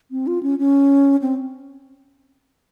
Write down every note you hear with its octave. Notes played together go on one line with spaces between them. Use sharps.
C4
F4
C#4
C#4
C4